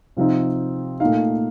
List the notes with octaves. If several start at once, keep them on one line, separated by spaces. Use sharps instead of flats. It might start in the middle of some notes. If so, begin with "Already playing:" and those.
C3 F3 C4 D#4 F5
A#2 A3 D#4 F5